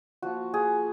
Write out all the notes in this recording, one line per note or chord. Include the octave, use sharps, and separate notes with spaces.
F3 A#3 F4 F#4
G#4